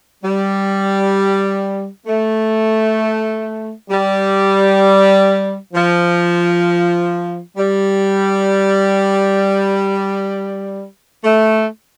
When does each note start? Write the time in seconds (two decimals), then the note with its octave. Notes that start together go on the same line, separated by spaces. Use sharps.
0.23 G3
2.07 A3
3.90 G3
5.73 F3
7.57 G3
11.23 A3